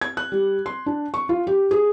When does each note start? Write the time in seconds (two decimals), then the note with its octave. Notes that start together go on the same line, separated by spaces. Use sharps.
0.01 G#6
0.17 F#6
0.32 G3
0.66 C6
0.86 D4
1.14 C#6
1.29 F4
1.47 G4
1.71 G#4